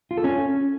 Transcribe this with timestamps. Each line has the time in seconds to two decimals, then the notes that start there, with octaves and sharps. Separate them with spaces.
0.11 F4
0.17 A4
0.24 C#4